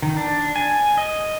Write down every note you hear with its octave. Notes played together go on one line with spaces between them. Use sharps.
D#3
D4
G#5
D#5